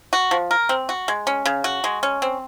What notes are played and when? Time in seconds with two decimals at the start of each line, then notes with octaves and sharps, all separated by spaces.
0.13 F#4
0.31 F3
0.51 A#4
0.69 C4
0.89 F#4
1.08 G#3
1.27 C#4
1.46 C#3
1.64 F#4
1.84 G#3
2.03 C#4
2.22 C4